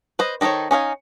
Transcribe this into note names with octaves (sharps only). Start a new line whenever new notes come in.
B4 C5 D#5
D#3 D#4 A4 C5 C#5
C#4 D#4 F5 G#5